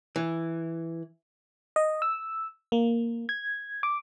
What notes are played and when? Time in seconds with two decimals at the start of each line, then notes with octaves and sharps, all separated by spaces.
0.16 E3
1.76 D#5
2.02 E6
2.72 A#3
3.29 G#6
3.83 D6